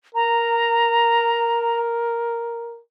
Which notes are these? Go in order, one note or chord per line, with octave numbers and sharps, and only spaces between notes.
A#4 A#5